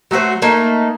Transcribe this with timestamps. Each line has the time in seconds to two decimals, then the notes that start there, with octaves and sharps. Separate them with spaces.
0.11 F#3 A3 F#4 C5
0.42 A3 A#3 D#4